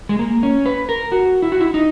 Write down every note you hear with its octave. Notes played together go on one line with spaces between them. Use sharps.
G#3
A#3
C#4
B4
A#4
F#4
E4
F#4
E4
D#4